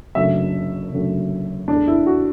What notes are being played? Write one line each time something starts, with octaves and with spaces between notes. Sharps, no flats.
F#1 F#2 D3 F#3 A3 E5
F#1 F#2 D3 F#3 A3
E2 D3 A3 D4
E4
F#4